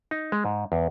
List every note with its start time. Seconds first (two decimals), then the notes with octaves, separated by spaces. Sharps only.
0.11 D#4
0.32 G#3
0.45 G#2
0.72 E2